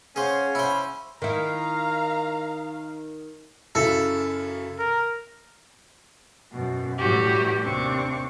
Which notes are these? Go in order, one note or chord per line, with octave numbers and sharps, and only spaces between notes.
C#4 G#4 C5 C#5 F5 F#5
E4 C5 B5
D#3 E4 F5 A#5
F#2 C#3 E4 A4
A#4
F#2 B2
A2 E3 F#3 G3 F#4 G4
D#2 C3 C4 D4 C#6 D6